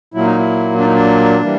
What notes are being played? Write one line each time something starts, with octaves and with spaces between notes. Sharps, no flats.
A#2 F#3 A#3 E4
D#4
E4
D4
D#4
D4
E3 G3 A#3